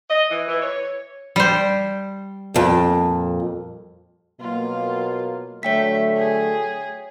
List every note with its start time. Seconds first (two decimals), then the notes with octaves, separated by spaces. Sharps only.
0.09 D#5
0.30 E3
0.47 E3
0.60 C#5
1.36 G3 C5
2.54 F2 A#2
4.40 B2 F#3 A#3 F4
5.63 D3 F#3 A3 C#5 E5 G5 B6
6.16 G#4